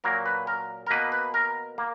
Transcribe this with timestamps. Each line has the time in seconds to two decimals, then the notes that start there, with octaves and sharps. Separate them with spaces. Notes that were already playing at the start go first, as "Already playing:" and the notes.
0.04 A#2 F#3 A#3 A#4
0.26 B4
0.47 A#4
0.87 A#4
0.90 B2 A#3 B4
1.12 B4
1.34 A#4
1.78 A#3